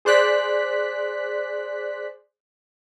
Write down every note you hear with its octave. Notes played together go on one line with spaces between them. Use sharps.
G#4 C5 D5 F#6 B6